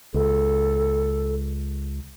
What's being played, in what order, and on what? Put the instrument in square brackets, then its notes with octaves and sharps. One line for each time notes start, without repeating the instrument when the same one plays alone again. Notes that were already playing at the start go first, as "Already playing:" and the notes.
[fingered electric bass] C#2 [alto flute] A4